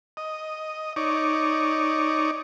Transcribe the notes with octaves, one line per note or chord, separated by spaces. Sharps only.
D#5
D#4 C#5 D5